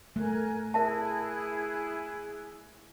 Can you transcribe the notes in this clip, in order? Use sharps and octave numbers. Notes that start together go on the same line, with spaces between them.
A3 A#4 G#5 F#6
E4 G#4 A#4 E5 A5 F#6